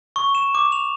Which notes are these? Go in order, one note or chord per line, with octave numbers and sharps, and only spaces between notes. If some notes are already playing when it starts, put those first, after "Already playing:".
C#6
E7
D6
F7